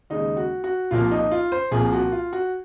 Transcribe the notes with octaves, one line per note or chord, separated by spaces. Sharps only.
D#2 C#3 G#3 D#4
F#4
F#4
C2 C3 F3 A#3 F4
D#4
F4
C5
C2 C3 F3 A#3 G#4
F#4
F4
F#4